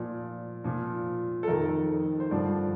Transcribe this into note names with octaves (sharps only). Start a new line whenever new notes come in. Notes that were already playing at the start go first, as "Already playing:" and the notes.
Already playing: A#2 F3 D5
A#2 F3
A4
F2 D#3 A#4
C5
G2 D3 F3 D5